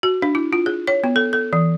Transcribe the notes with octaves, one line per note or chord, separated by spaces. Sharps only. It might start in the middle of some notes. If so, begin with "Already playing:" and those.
F#4
D4
E4
F4
G#4
C#5
B3
A4
A4
E3